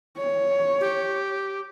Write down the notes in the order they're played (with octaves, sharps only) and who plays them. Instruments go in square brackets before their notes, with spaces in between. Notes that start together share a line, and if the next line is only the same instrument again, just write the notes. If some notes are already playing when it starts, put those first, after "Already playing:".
[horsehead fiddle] C#5
[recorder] G4